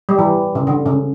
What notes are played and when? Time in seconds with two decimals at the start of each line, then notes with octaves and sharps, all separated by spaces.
0.09 G3
0.19 E3
0.55 C#3
0.67 D3
0.86 C#3